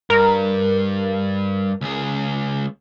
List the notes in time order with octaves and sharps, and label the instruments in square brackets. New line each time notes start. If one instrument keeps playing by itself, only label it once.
[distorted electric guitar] G2 [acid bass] A#4
[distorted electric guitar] C#2 G#4